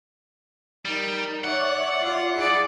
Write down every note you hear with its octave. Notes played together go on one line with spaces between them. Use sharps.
G3 D#4 A#4
C#5 D5 E5 F#5
F4
E4 G#4 D5